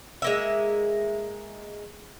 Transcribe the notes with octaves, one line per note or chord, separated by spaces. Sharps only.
G#3 A#3 E5